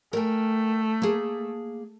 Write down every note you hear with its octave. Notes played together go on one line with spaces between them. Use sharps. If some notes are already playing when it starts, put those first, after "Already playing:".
A3 A#4 G5 G#5
A#3 G#4